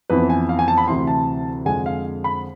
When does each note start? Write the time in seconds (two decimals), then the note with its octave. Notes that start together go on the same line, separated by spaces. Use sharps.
0.10 F2 E3 B3 B4
0.30 G#5
0.49 F5
0.59 G#5
0.68 A5
0.78 B5
0.87 D2 C3 E3 C6
1.07 A5
1.65 F2 D3 G#3 G#5
1.86 F5
2.24 B5